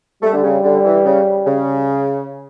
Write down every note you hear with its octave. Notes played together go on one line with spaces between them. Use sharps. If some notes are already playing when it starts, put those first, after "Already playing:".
G3 A3
D3
C#3
D3
E3
C#3
C#3